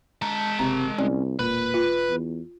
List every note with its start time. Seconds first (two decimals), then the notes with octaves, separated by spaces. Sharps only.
0.22 G#3 A5 A#5
0.59 F#1 C3 A#5
0.98 C2 C#4 D5
1.39 E1 A#2 B4
1.74 F4
2.09 E2